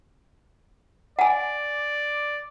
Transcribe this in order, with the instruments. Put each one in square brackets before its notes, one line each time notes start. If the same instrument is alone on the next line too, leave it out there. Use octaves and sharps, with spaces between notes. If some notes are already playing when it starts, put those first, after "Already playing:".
[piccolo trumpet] D5 [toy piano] F#5 G#5